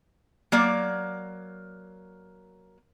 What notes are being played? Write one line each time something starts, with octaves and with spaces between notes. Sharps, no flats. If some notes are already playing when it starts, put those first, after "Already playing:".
F#3 A#3 D5